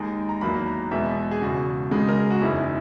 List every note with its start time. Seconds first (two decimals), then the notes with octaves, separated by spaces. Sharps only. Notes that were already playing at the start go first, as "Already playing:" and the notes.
Already playing: D#2 D#3 G#3 A#5
0.29 A#5
0.41 E2 D#3 F#3 A#3 B5
0.66 A#5
0.91 E2 B2 G#3 E5
1.31 G#4
1.41 E1 E2 C#3 F#4
1.91 C#2 C#3 G#3
2.08 A#4
2.19 G#4
2.31 F#4
2.41 F#1 E2 D#3 G#3 E4